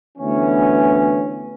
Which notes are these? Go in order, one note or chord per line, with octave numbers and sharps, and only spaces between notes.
D2 E3 B3 C#4